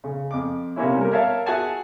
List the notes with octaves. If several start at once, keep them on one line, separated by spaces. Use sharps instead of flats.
C#3
F2 D6
C3 A#3 C#4 E4
G3 A#4
A#4 C#5 E5 F5 A5
F#4 G#4 E5 F#5 G#5 A5